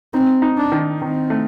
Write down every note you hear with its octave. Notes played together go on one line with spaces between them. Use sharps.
C4 D#4
D#4
D4
D#3
D#3 C4
A3